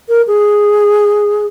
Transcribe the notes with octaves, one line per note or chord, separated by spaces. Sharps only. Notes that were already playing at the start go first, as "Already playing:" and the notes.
A#4
G#4